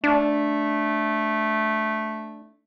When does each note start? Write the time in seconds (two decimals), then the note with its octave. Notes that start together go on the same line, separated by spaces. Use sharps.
0.04 A3 D4